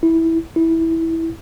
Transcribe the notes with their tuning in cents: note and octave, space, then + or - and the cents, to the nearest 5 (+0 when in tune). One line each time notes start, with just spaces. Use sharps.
E4 -10
E4 -10